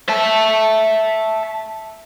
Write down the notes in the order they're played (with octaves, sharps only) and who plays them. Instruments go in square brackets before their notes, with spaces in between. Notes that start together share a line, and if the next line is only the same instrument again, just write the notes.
[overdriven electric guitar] E5 A5